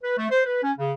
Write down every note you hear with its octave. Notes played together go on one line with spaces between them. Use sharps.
B4
A3
C5
B4
C#4
C#3